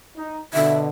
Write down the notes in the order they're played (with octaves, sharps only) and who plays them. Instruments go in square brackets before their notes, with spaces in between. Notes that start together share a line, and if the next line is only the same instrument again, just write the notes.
[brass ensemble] D#4
[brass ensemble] B2 D3 [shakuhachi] E5